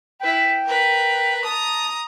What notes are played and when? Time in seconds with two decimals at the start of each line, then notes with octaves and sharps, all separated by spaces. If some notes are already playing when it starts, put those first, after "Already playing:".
0.21 E4 B4 G5
0.66 A#4 B4
1.45 A5 A#5 D#6